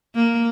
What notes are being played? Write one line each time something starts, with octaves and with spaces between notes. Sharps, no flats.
A#3